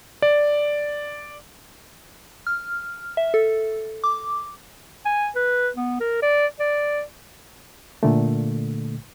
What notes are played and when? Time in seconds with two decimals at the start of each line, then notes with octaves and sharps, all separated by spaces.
0.22 D5
2.47 F6
3.17 E5
3.34 A4
4.04 D6
5.05 G#5
5.36 B4
5.76 B3
6.00 A#4
6.22 D5
6.60 D5
8.03 A#2 D3 A3